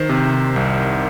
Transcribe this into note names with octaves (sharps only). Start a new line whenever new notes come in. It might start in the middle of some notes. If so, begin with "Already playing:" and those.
Already playing: D#3 C5
C3
C2